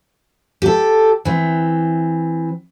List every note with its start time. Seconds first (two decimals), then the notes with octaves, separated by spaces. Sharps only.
0.62 G4 A4
1.25 E3 C4